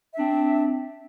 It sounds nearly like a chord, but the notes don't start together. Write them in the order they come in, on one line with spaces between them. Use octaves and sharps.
E5 D4 C4